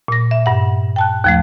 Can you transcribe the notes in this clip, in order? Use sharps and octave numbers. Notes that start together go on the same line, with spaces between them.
A#2 A#6
E5
G2 F#5
G5 A5 F#6
D#2 F3 A3